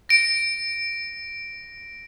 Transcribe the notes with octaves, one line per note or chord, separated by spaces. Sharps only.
A#6 D7